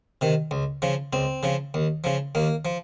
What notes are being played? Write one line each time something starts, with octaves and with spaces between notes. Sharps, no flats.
C3 D#3
C#2
C#3 F3
C#2 C4
C#3 F3
D#2
C#3 F3
D#2 A#3
F3